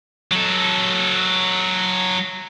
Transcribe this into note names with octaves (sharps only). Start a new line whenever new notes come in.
F#3 A4